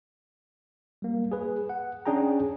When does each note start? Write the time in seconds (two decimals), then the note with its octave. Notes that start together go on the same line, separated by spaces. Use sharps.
1.02 G3 A#3
1.32 G#4 B4
1.69 F#5
2.06 C#4 D4 G#4 G5 A#5